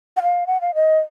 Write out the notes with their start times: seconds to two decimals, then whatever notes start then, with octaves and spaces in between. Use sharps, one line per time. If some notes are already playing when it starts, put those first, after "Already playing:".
0.17 F#5
0.23 F5
0.47 F#5
0.61 F5
0.75 D#5